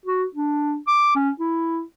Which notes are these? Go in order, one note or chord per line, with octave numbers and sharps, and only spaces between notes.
F#4
D4
D6
C#4
E4